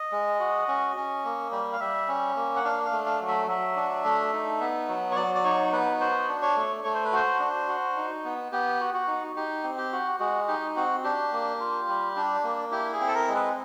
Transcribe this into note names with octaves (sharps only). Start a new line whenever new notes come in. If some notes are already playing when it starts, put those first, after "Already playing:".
Already playing: D#5
G#3
F#4
C#4
C#4
A#3
G3
F5
G3 E5
C#4
A#3
F#5
D4 F5
F5
A3
F5
F#3
E5
F#3 E5
D4
A3
D#4
B3
F#3
C#5
F#3 D5
D5
D#4 C#5
B3 B4
F#4 C5
D4
C#5
A3
A3 C#5
C5
B4
F#4 C5
D4
F#4
D#4
B3
B3 G4
F#4
F#4
D#4
D#4 G4
C4
G4
F#4
G#3 F#4
D#4 G4
C4 F#4
D4 G4
A#3
F4
G3
D4
A#3
E4 G4
G#4
C4
A4
A#4
G#3
B4